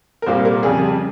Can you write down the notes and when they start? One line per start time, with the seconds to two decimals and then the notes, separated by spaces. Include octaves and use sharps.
0.22 A#4
0.26 C2 A#2 G3 A#3 C5
0.45 A#4
0.63 F2 C#3 G3 G#4